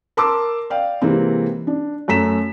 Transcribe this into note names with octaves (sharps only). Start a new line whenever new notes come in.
A#4 A5 C6 D6 E6
D5 F5 G5
C3 E3 G#3 A#3 C4
D4
F#2 A3 A4 A#5 B6 E7